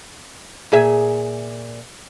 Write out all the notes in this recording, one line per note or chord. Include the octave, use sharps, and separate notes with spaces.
A#2 G#4 E5